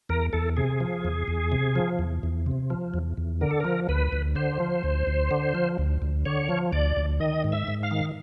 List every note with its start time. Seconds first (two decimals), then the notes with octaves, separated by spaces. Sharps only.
0.09 E2 A#4
0.33 E2 A4
0.57 C3 G#4
0.80 F3
1.05 E2
1.28 E2
1.52 C3
1.75 F3
1.99 E2
2.23 E2
2.46 C3
2.70 F3
2.94 E2
3.17 E2
3.41 D3 A#4
3.51 A4
3.60 F3 A#4
3.89 D2 B4
4.12 D2
4.36 D3 C5
4.60 F3
4.84 D2
5.07 D2
5.31 D3
5.55 F3
5.78 D2
6.02 D2
6.25 D3 C#5
6.49 F3
6.72 D2 D5
6.97 D2
7.20 D#3 D#5
7.44 G#2
7.52 E5
7.68 G#2
7.83 F5
7.91 D#3